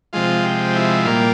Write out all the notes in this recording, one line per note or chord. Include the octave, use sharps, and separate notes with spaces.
C3 F3 G#3 F4
G4
E4
A#2 G3 A#3 F4